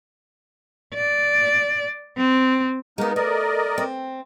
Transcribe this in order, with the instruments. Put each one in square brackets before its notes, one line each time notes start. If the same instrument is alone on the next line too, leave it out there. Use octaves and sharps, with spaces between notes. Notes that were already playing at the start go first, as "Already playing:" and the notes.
[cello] D5
C4
[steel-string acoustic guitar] G#3 B3 [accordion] A#3 D#4 A#4
[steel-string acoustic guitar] A3 [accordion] A#4 D5 D#5
[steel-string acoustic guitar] C4